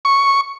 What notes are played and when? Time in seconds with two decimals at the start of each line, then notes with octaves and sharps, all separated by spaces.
0.05 C#6